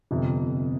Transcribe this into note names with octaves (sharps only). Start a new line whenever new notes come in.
G1 F2 C3